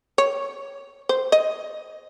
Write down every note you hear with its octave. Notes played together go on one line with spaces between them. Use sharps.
C#5
C5
D#5